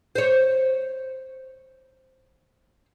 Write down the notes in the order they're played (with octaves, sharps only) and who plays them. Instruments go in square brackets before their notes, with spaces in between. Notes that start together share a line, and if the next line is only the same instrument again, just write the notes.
[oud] C5 C#5